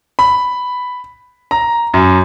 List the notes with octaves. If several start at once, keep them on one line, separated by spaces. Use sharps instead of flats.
B5
A#5
F#2